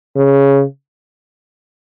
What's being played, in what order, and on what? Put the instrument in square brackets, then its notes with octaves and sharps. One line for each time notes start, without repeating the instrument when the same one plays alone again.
[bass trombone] C#3